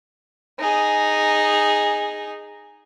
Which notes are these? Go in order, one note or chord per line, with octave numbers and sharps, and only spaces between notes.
D#4 G#4